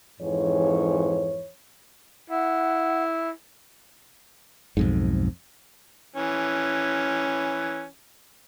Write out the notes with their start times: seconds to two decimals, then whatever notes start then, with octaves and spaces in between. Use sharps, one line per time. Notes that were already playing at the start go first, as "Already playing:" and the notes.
0.21 F2 G#2 E3 C#5
2.30 E4 F#5
4.77 B1 F2 G#2
6.16 E3 C#4